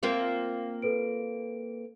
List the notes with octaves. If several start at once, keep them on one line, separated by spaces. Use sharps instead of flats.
A#3 C4 F4
A4 B4 D7